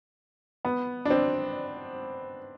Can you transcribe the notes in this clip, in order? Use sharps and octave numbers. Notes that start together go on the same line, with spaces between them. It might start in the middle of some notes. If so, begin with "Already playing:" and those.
B3
D4
C4